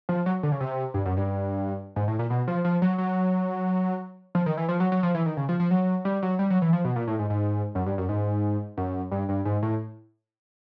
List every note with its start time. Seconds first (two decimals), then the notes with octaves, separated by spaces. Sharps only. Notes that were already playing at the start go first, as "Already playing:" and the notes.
0.09 F3
0.26 F#3
0.43 D3
0.52 C#3
0.60 C3
0.94 G2
1.05 F#2
1.17 G2
1.96 G#2
2.08 A2
2.19 A#2
2.30 B2
2.48 F3
2.65 F3
2.82 F#3
2.98 F#3
4.35 F3
4.46 D#3
4.57 E3
4.69 F3
4.80 F#3
4.92 F#3
5.03 F3
5.14 E3
5.26 D#3
5.37 C#3
5.49 F3
5.60 F3
5.71 F#3
6.05 G3
6.23 F#3
6.39 G3
6.50 F#3
6.62 E3
6.73 F3
6.85 B2
6.96 A#2
7.07 A2
7.19 G#2
7.30 G#2
7.75 F#2
7.86 G2
7.98 F#2
8.09 G#2
8.77 F#2
9.12 G2
9.29 G2
9.45 G#2
9.63 A2